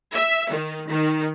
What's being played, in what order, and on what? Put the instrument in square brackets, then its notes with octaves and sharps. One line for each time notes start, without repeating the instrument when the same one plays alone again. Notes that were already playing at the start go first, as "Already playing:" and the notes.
[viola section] E5
D#3
D#3